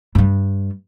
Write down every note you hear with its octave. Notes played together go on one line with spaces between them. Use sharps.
G2 G3